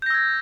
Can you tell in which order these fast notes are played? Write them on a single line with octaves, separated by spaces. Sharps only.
G6 A#6 E6 G#6